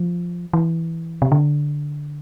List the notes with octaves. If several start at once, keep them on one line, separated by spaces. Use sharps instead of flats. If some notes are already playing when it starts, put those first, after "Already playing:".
Already playing: F3
E3
C3
D3